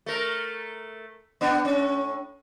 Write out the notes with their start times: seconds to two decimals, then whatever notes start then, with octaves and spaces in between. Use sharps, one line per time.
0.06 A3 A#4
1.41 B3 D4
1.65 A2 C#4